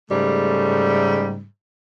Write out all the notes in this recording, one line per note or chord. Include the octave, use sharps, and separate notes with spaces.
G#2 C#3 G3 A3